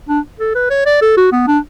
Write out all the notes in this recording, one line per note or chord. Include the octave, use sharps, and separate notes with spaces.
D4
A4
B4
C#5
D5
A4
F#4
B3
D4